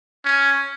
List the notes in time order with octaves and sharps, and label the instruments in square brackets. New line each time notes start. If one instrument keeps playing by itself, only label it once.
[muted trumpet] C#4